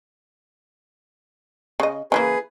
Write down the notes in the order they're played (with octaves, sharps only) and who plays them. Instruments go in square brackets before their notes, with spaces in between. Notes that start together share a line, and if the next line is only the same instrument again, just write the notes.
[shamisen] C#3 D#5
[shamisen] C#3 E3 A#3 [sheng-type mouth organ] G#4 B4